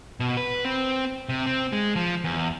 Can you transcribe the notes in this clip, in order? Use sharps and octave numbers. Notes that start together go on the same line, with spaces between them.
B2
B4
C4
C3
C4
G#3
F3
E2